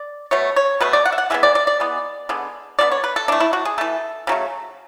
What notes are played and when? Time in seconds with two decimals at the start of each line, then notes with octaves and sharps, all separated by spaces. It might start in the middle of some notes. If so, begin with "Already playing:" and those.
Already playing: D5
0.31 B2 A3 C#5
0.56 C#5
0.81 B2 A3 B4
0.93 D5
1.05 F#5
1.12 E5
1.18 F#5
1.30 E3 G#3 B3 E5
1.43 D5
1.55 D5
1.67 D5
1.80 E3 G#3 B3
2.29 D3 G#3 B3
2.79 D3 G#3 B3 D5
2.91 C#5
3.04 B4
3.16 A4
3.28 E3 A3 D4
3.40 E4
3.53 F#4
3.65 G#4
3.78 E3 A3 A4
4.27 C#3 F#3 A3